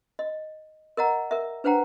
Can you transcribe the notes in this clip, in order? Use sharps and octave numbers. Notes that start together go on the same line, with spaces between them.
D#5
A#4 D#5 F#5 A#5
A#4 E5
D4 B4 C5 F#5 G5 A#5